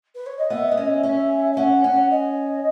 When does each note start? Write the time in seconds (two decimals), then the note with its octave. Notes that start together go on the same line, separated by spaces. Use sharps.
0.15 B4
0.26 C#5
0.38 D#5
0.50 B3 E5
0.67 B3 D#5
0.77 C#4
0.86 E5
1.03 C#4
1.53 E5
1.57 C#4 F#5
1.84 C#4
2.10 D#5